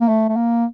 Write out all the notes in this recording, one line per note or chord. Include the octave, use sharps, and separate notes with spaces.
A#3
A3
A3
A#3